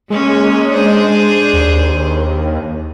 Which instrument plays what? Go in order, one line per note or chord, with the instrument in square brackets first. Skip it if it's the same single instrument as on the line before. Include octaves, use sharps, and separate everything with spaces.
[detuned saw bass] G#3 [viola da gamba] A#3 C#4 C#5
[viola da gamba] D4 G#4 C5
[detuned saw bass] D#2